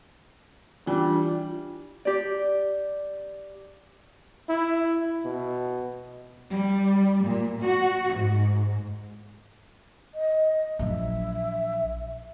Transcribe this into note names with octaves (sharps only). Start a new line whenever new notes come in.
E3 G3 D4 F4
G4 D5
E4
B2
G3
A#2
F#4
G#2
D#5
A#1 F#3 E5